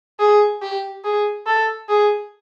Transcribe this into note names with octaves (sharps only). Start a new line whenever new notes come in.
G#4
G4
G#4
A4
G#4